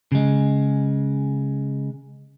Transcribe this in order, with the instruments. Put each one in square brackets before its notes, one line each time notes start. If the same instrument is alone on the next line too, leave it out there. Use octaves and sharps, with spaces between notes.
[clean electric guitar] C#3 G#3